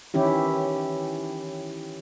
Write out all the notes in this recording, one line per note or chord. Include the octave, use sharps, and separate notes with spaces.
D#3 E3 C#4 E4 G4